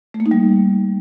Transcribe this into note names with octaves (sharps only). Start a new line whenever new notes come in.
A3
A#3
D#4
G3